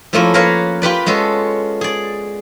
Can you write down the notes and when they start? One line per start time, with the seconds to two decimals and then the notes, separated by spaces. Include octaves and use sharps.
0.13 F3 A3 A#3 C#4 E4 F4
0.34 A#3 A#4 B4 C#5 F5
0.82 F4 G4 B4 D5
1.06 G#3 B3 C#4 A4
1.81 G#4 D5